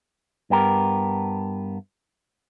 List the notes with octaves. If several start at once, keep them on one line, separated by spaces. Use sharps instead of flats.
G2 B3 G4 A#4